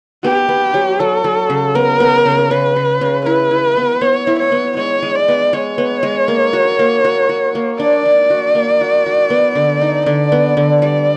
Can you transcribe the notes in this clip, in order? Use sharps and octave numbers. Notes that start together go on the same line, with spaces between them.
B3 G4
B3
F#3
F#3 A4
F#3
C#3
B3 A#4
B3
C#3
C#3 B4
C#3
C#3
E4 B4
E4
B3
B3 C#5
E4
C#5
B3
G#3 C#5
G#3
D5
B3
G#3 C#5
B3
G#3
A#3
F#4
A#3
F#4
F#4
A#3
D4 D5
D4
F#4
A#3
F#4
F#4
B3
D3
D#4
D3 D5
B3
D3
G3 D5